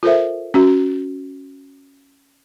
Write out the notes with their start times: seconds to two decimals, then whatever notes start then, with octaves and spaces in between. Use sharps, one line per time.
0.03 F4 A4 A#4 C5 E5
0.54 C#4 F#4